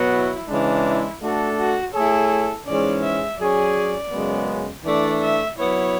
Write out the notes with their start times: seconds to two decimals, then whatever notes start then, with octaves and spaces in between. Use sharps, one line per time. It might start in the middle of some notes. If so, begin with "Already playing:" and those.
Already playing: B2 F#3 B3 F#4
0.13 E4
0.49 C#3 E3 G#3 D4
0.86 E4
1.22 A3 D4 F#4 A4
1.58 F#4
1.94 A3 E4 G#4 A4 C#5
2.67 G#2 E3 G#3 C#4 D5
3.03 E5
3.40 F#3 C#4 G#4 D5
4.12 F#2 C#3 G#3 B3
4.85 E3 A3 D4 D5
5.22 E5
5.58 F#3 B3 E4 C#5